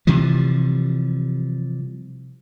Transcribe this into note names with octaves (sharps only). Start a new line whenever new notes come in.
C3 E3 F3 G3